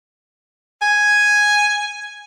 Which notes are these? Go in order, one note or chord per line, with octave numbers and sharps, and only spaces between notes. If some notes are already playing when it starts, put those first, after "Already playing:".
G#5